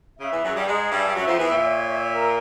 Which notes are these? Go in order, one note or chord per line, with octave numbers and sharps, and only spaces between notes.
C#3 E5
E2 E3
F#2 F#3 G#4
G2 G3
G#2 G#3 G#4
G2 G3 E5
G3
F#2 F#3 E5
F2 F3
E2 E3 E5
A#2
C#5
E5
A#4